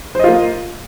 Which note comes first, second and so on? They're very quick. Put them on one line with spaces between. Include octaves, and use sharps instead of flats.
C5 D#5 F4 A#3